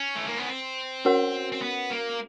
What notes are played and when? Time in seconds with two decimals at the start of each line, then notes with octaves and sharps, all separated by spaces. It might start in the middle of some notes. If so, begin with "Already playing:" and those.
Already playing: C#4
0.16 A3
0.27 A#3
0.38 B3
0.49 C4
1.05 C#4 F#4 A#4 C#5 F#5
1.52 C4
1.62 B3
1.90 A#3